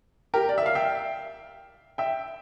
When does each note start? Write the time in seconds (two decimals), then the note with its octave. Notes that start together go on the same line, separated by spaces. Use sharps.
0.34 G4 A#4
0.49 D5
0.58 E5
0.66 F5
0.75 E5 G5
1.98 E5 G5